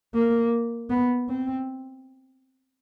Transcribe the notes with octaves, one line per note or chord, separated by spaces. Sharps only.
A#3
B3
C4